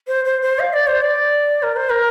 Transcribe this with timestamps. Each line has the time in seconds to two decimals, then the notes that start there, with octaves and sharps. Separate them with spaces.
0.07 C5
0.25 C5
0.42 C5
0.59 F5
0.73 D5
0.87 C5
1.01 D5
1.63 A#4
1.76 C5
1.90 A#4